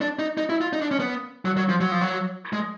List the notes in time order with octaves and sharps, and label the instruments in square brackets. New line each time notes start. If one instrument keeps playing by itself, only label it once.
[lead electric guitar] D4
D#4
D#4
E4
F4
D#4
D4
C#4
B3
F#3
F#3
F3
F#3
F3
F#3
G#3